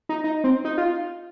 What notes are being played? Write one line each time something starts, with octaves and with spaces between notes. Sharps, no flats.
D#4
D#4
C4
D#4
F4